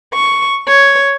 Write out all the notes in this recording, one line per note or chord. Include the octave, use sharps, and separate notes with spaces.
C#6
C#5